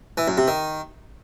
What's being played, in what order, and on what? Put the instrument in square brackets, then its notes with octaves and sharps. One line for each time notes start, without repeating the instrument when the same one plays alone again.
[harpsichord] E3
F#2
C3
D#3